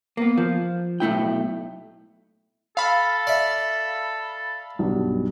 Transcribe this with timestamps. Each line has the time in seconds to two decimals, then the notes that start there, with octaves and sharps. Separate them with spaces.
0.17 A#3 B3
0.38 F3
1.00 B1 A3 E4 G5
2.77 A4 F5 B5
3.27 D5 E5
4.79 B1 G2